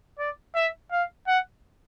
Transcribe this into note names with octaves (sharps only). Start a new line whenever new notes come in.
D5
E5
F5
F#5